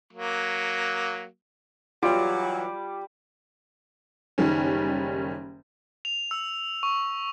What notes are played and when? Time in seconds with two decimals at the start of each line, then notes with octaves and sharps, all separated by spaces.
0.13 F#3 A#3
2.03 E3 F#3 G3 F4 D6
4.38 F#1 D#3 G3 C#4
6.05 F7
6.31 E6
6.83 C#6